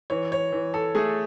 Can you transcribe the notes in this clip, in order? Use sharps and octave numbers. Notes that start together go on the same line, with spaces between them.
E3 C#5
C#5
E3
A4
A3 G#4